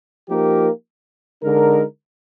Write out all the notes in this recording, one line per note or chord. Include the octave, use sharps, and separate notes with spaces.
F3 A#3 D#4 G4 A#4
D3 G#3 D#4 A#4